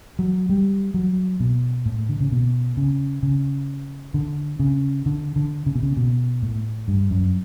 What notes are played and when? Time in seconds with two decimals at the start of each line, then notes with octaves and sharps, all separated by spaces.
0.19 F#3
0.49 G3
0.94 F#3
1.40 B2
1.86 A2
2.09 D3
2.20 C#3
2.32 B2
2.77 C#3
3.23 C#3
4.14 D3
4.60 C#3
5.06 D3
5.36 D3
5.66 C#3
5.75 B2
5.83 C#3
5.97 B2
6.42 A2
6.88 G2
7.11 F#2